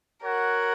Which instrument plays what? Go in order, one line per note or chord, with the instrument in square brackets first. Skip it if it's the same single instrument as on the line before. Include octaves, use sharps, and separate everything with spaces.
[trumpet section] F#4 C#5 F#5 [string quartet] A#4